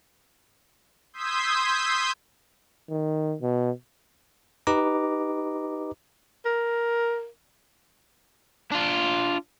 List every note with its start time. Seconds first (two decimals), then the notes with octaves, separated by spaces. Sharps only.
1.13 C6 D#6 E6 G6 G#6 B6
2.90 D#3
3.42 B2
4.67 D#4 G4 B4 D#5 A#5 D6
6.45 A#4
8.71 D4 F4